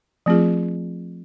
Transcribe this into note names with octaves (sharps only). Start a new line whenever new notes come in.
F3 A3 C4 F4 G#4